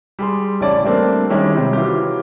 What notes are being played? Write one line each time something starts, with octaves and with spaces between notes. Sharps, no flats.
G3 G#4 C6
A1 C#3 C#5 D5 A5
G3 A3 A#3 C4 D4
D#3 G3 G#3 C#4 E4
C3 G3 C4
E3 F#3 F4 G4